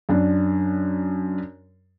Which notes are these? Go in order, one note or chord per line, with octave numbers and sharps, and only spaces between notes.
F#2 D4